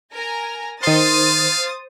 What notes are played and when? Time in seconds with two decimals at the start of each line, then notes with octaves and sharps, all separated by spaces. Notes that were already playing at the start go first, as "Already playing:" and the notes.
0.13 A#4 G#5 A#5
0.83 D#3 C5 F5 C6 D#6 A6